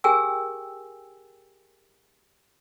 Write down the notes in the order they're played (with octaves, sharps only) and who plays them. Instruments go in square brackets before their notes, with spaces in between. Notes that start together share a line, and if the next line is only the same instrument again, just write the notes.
[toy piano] G4 G#4 A#4 G5 G#5 E6